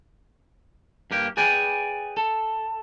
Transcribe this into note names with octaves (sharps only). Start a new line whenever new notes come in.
G2 A#3 G4
G#4 B4 D5 G5 G#5
A4